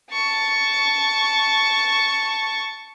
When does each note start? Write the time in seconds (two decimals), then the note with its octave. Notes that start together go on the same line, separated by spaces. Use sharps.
0.12 A5 C#6